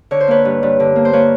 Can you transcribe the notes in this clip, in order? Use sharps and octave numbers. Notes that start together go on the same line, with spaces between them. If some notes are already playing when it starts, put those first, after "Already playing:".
D3 C#5
C5
A#3 B4 C#5
G2
G2
D3
A#3
C5
A#3 B4 C#5